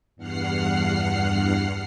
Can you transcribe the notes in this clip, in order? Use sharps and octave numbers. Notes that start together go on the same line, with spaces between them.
E2 G2 F#5 F6 C7